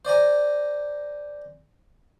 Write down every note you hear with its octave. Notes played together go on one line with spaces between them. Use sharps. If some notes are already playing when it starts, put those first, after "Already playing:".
C5 D5 G#5 A#5